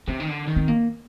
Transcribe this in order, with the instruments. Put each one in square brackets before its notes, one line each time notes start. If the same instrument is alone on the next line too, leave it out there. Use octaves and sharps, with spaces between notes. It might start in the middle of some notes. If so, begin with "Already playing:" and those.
[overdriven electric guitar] C3 [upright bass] C4
[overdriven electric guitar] D#3
D3
D#3
[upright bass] C4
A#3